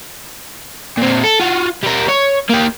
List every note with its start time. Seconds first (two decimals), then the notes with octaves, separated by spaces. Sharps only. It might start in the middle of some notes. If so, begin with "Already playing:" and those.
0.98 A#2 C4
1.24 A4
1.40 F4 F#4
1.83 G3 A#4
2.08 C#5
2.49 A#3 G4